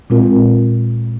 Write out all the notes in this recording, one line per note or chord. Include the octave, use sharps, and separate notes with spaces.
A#2 G#3 C4 F4 A#4